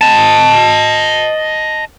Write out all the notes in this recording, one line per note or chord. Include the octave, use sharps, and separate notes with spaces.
D#5 A5